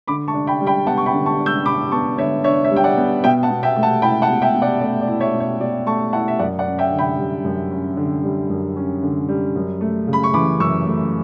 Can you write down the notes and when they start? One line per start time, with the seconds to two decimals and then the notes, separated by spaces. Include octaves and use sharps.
0.07 D3 B5 D6
0.28 A5 C#6
0.34 D4
0.47 G5 B5
0.61 G3
0.67 G5 B5
0.86 B3 F#5 A5
0.97 C#6
1.06 G5 B5
1.13 D3
1.26 A5 C#6
1.39 D4
1.46 E6 G6
1.66 G3 B5 D6
1.91 B3 A5 C#6
2.18 D3 C#5 E5
2.44 D4 C#5 E5
2.64 C#5 E5
2.71 G3
2.76 G5
2.84 D5 F#5
2.97 B3
3.24 B2 E5 G5
3.43 F#5 A5
3.50 B2
3.63 E5 G5
3.76 A3
3.83 F#5 A5
4.02 E4 G5 B5
4.22 F#5 A5
4.29 B2
4.42 E5 G5
4.54 B2
4.62 D5 F#5
4.81 A3 D5
5.01 D5
5.08 E4
5.20 C#5 E5
5.34 B2
5.40 C#5
5.60 B2 D5
5.87 A3 A5 C#6
6.13 E4 F#5 A5
6.28 E5
6.39 F#2 D5 F#5
6.59 D5 F#5
6.66 C#4
6.79 E5 G5
6.92 D3
6.99 G5 B5
7.18 G3
7.44 F#2
7.71 C#4
7.97 D3
8.23 G3
8.50 F#2
8.76 C#4
9.03 D3
9.29 G3
9.55 F#2
9.81 A3
10.07 C#3
10.13 B5
10.24 C#6
10.34 E3 B5 D6
10.60 F#2 C#6 E6
10.87 A3